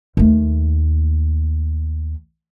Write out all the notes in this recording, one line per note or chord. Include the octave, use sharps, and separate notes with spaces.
D#2 A3